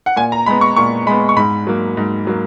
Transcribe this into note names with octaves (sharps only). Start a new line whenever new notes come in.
F#5
A#2 G#5
A#5
G#3 B3 B5
C#6
A#2 C#6
G#3 B3 B5
C#6
G#2 B5
F#3 A#3
G#2
F#3 A#3